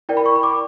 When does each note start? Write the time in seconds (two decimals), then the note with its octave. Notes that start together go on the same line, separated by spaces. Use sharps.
0.09 E4 A#4 D5 G5
0.17 B5
0.26 C#6
0.36 B5
0.43 D6